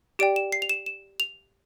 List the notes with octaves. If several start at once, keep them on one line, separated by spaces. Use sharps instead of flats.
G4 D5 G5 D7
E7
C7
F7
E7
E7
F7